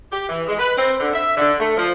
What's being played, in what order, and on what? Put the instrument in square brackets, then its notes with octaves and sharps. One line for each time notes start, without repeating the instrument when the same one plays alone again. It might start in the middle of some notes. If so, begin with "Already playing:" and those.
[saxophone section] G4
E3
G#3
B4
C4
D3
E5
D3
A3
F3